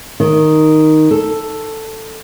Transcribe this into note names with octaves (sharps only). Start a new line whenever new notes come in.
D#3
A4